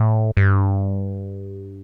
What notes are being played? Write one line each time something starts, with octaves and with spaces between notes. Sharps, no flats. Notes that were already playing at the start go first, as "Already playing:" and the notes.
Already playing: A2
G2